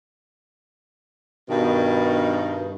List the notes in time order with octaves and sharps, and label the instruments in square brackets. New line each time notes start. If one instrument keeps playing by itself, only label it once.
[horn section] G2 B2 D#3